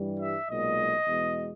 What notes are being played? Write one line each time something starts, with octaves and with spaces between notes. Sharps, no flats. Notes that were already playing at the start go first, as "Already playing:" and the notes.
Already playing: G2 E3 G3
E5
B1 A#2 G#3 D#5
E2 B2 G#3